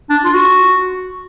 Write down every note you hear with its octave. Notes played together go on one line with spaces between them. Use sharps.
D4
F4
F#4